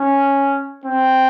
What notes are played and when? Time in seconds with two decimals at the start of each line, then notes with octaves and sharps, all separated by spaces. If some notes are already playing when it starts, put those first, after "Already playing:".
Already playing: C#4
0.86 C4